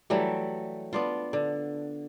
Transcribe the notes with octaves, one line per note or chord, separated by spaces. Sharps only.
E3 F#3 G3 A3
B3 D4 F4
D3